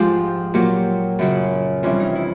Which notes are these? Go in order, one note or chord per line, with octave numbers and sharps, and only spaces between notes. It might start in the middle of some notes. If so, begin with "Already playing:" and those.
Already playing: G#2 F3 G#3 F4 G4
A#2 F#3 G4
F#2 C#3 F#3
F2 C3 E3 G3 C#4
D#4
E4